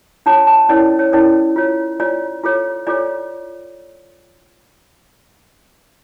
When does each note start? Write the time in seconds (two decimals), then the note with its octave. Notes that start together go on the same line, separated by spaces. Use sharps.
0.26 D4 F4 C#5 A5
0.47 A5
0.69 C#4 E4 A#4 C#5 D5
0.99 C#5
1.12 C#4 E4 A#4 C#5 D5
1.56 F4 C#5
2.00 F4 C#5 D5
2.44 F4 A4 C#5
2.87 F4 A4 C#5 D5